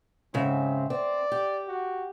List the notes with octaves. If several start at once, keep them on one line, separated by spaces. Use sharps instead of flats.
G#2 C#3 C4 E5
C4 D5
G4
F#4